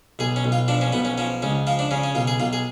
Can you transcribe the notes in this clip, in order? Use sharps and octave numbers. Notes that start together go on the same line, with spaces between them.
B1 G#4
C#4
B1
F4
F3 D4
C#4
B1 B3
C#4
F3 C#4
C#2 C#4
F3 F4
D4
C#3 C#4
C#4
B1 F4
G#4
B1 F4
G#4